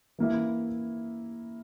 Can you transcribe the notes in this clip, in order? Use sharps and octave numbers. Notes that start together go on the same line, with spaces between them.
E3 A#3 E4